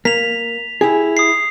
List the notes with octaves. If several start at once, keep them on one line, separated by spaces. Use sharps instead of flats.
A#3 B6 F7
E4 G4 G#4
D#6 C7